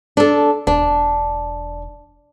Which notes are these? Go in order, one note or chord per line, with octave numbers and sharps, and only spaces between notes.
D4 A4
E1 D4